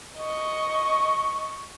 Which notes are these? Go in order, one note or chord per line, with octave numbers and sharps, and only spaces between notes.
D#5 C#6